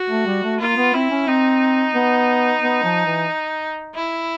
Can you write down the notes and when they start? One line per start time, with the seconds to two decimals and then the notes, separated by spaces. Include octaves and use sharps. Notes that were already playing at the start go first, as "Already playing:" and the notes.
Already playing: F#4
0.10 A3
0.26 G3
0.43 A3
0.60 A#3 F4
0.77 B3
0.94 C4 E4
1.11 C#4
1.27 C4 D#4
1.95 B3
2.62 B3
2.84 F3
3.06 E3
3.96 E4